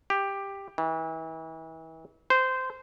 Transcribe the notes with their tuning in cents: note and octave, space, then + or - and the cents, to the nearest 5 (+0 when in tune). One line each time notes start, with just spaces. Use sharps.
G4 +10
E3 -35
C5 -15